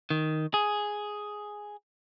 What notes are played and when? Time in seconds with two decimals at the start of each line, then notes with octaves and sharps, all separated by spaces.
0.10 D#3
0.54 G#4